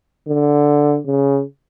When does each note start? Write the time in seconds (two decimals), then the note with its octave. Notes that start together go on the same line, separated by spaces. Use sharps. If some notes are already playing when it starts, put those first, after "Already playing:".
0.28 D3
1.06 C#3